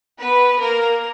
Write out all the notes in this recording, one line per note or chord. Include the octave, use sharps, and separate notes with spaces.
B3 B4
A#3 A#4